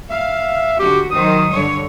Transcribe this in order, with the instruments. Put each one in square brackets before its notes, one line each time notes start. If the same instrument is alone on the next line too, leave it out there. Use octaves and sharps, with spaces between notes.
[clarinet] E5 [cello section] F5
[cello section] D3 F#4 [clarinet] G4
[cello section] D#3 F#3 C5 [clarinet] D#6
[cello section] G2 D3 C#5